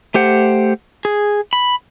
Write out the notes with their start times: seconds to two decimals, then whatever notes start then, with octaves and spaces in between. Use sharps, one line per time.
0.14 A3 G4 C5 F#5
1.05 G#4
1.53 B5